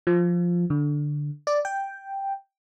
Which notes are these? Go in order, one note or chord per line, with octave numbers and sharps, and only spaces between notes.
F3
D3
D5
G5